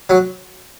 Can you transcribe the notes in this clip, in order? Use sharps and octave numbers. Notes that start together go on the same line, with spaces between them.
F#3